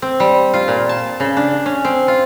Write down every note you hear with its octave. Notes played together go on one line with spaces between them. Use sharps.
C4
G3
F4
A#2
A5
C#3
D4
C#4
C4
F4